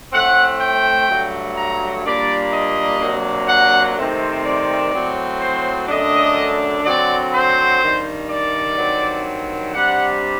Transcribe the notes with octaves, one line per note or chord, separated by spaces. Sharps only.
A2 A3 C4 F#5
G5
G2 F#3 A3
A#5
A#2 G3 A#3 D4 D5
D#5
C3 F#3 A#3 D4
F#5
C3 D#3 A3 C4
D5
A2 F#3 C4
C5
F#2 D3 A3 D4 D#5
D3 F#3 C4 D5
C5
G2 D#3 G3
D5
G2 D#3 F#3 C4
C3 G3 D4 F#5